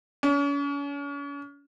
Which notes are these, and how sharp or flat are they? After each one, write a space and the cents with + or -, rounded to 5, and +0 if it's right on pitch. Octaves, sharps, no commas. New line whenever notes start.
C#4 +40